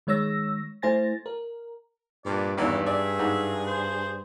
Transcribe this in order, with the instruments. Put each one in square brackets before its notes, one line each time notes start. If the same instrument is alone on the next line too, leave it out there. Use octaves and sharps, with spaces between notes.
[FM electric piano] D#3 G#3 C#5 E6 A#6
A3 E4 C5 G#5 A6 A#6
A#4
[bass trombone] G2 [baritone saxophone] A#2 [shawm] D5
[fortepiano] G#1 E2 [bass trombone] G2 [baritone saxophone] E3 [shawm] E5
[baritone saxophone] G#4 [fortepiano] D5 [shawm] E5
[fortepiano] G#2
[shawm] C5